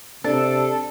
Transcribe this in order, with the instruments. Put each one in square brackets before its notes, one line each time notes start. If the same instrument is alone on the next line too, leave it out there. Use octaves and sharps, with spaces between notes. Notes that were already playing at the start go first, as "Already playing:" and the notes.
[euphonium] C3 [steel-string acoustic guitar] D4 [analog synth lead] A4